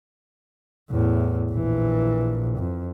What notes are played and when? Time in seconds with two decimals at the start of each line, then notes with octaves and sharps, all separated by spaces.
0.90 E2 A2
1.51 A#1 E3
2.58 F2